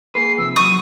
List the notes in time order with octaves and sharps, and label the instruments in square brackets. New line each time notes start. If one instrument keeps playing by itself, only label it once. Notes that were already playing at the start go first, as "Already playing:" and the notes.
[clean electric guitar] A#3 G#4 B4 [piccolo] C7
[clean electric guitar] C3 F3 [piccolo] E6
[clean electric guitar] C#3 F#3 [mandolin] C#6 D#6 [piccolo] D#7